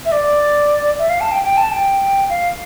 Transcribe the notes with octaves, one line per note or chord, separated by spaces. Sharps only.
E5
D5
E5
F5
A5
G5
G5
A5
G5
F5